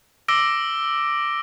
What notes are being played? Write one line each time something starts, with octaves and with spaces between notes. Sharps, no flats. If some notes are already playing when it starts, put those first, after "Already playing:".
D6 E6 A#6 D7 G7